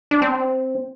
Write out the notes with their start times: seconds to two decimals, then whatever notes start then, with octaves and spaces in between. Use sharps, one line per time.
0.11 D4
0.22 C4